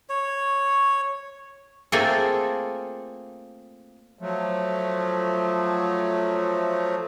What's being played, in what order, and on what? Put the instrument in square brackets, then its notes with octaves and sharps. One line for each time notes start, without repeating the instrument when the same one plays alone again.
[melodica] C#5
[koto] A3 A#3 C4 F4 G#4 A4
[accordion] F3 F#3 A3